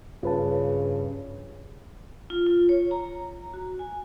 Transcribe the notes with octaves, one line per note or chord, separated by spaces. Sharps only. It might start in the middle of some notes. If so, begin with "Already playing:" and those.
G2 C#3 F4 B4 A5
F4
F4
C#5
A#5
F#4
G#5